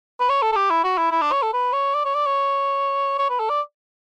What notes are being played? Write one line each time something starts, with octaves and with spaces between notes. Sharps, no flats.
B4
C#5
A4
A4
G4
E4
F#4
E4
E4
D4
C#5
A4
B4
C#5
D5
C#5
D5
C#5
C#5
B4
A4
D5